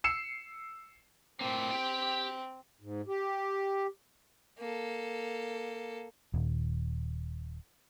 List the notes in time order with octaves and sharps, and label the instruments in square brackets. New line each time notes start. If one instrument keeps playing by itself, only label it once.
[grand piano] E6 C7 C#7 E7
[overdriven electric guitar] A2 A#3 [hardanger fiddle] C4
[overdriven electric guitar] G4 G5
[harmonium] G#2
G4
[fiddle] A#3 A4
[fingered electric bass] D#1